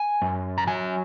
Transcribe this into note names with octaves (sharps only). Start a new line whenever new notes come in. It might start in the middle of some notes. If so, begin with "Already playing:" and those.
Already playing: G#5
F#2
A#5
F#3 G#5